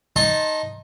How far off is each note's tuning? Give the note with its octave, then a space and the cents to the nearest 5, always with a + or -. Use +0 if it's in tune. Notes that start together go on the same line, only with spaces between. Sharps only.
D#4 +0 A5 +0 C6 +30